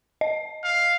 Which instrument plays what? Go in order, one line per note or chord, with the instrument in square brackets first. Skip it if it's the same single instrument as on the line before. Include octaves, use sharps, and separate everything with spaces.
[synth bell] D#5
[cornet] F5